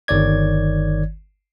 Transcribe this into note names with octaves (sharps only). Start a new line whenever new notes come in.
G1 D#3 C#5 D5 G#6